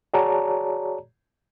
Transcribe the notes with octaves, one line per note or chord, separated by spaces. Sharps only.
F#4 G#4 C#5 D5 A5 A#5